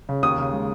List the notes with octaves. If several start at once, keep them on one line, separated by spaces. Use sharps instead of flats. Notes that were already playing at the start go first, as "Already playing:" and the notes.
C#3
D#2 D#6
C#3
G#3